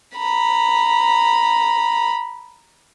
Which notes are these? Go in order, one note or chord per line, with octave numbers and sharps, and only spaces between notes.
A#5 B5